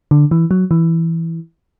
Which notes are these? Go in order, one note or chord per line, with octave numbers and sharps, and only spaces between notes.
D3
E3
F#3
E3